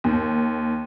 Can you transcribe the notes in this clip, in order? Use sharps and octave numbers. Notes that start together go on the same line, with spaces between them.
D#2